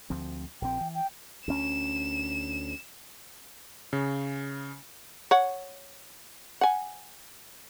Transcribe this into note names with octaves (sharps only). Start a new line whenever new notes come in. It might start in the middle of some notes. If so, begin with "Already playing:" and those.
D2 F3 C4
A#1 C4 G5
E3
G5
D2 C#4 E7
C#3
C#5 F#5
F#5 G#5